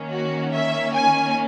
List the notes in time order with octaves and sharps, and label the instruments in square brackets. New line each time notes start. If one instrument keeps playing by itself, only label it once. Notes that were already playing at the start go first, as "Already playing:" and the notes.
Already playing: [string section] D#3 A#3 C#4
F#4
E5
G#5